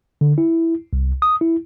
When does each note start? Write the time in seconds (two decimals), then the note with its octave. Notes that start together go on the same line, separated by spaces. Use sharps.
0.21 D3
0.38 E4
0.93 C2
1.22 D#6
1.41 E4